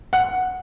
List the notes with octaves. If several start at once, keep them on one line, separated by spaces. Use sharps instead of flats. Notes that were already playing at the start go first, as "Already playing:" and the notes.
F#5